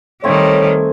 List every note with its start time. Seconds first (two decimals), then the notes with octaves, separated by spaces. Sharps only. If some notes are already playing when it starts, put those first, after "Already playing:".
0.24 D#3 G3 A3 C4 C#5 G#5